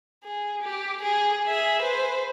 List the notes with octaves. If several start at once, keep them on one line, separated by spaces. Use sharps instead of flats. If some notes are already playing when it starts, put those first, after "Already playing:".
G#4
G4
G#4
G#4 E5
B4 C5